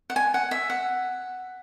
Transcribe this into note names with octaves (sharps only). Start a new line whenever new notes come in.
F#5
G#5
F#5
E5
F#5